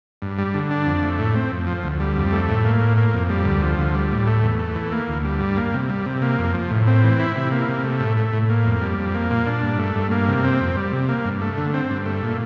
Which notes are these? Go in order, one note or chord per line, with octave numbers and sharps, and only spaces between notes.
G2
G3
D3
D4
F2
A3
A2
C4
F2
F3
D2
G3
F2
A3
A2
A#3
A2
A#3
F2
G3
D2
F3
D2
G3
A2
A3
E2
A3
E3
A#3
D2
G3
G2
A#3
C3
G3
C3
A#3
F2
F3
A2
C4
E3
E4
C3
A#3
C3
A3
A2
A3
A2
A#3
F2
G3
F2
A#3
A#2
D4
G2
A3
G2
A#3
C3
C4
F2
G3
C3
A#3
G2
A3
D3
C4
G2
A3
A#2